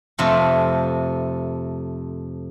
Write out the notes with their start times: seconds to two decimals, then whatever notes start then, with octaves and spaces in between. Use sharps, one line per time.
0.19 F2 C3 A3 F4